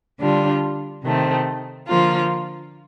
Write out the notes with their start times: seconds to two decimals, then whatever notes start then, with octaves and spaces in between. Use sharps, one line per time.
0.19 D3 G3 D4 F4
1.03 C3 D#3 A3 C4
1.87 D3 F3 A#3 F4